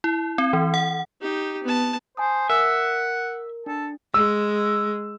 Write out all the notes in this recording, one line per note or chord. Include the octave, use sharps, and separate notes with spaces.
E4
C4
E3
F#5
D#4 G4
B3 A5
C5 G#5 A5 D#6
A#4 E5 F#5
D4 A4
G#3 E6